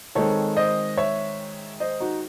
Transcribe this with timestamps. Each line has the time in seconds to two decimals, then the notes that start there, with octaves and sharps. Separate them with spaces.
0.15 D#3 G#3 C4 A4 C#5
0.57 C5 D#5
0.97 C#5 E5
1.80 C5 D#5
2.00 D#4 F#4